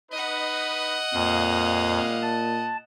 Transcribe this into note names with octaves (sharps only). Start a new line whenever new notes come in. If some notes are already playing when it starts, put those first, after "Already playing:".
D#4 B4 D#5 F#5
F2 A#2 G3 G#3 F5
A5